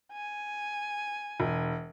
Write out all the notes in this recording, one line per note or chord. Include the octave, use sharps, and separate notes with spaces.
G#5
E1